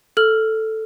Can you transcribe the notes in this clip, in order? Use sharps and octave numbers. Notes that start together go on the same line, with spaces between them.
A4 F6 F#7